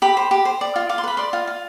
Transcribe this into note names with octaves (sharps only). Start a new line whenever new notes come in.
G4 B5
C5
G4
C5
D5
F4
F4 D6
C6
B4 B5
D5 C6
F4
F4